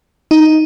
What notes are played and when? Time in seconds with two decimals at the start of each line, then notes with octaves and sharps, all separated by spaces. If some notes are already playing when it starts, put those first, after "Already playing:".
0.31 D#4